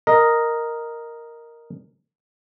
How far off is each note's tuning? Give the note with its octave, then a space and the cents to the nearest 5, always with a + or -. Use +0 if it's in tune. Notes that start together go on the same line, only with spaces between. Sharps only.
A#4 +0 D#5 +0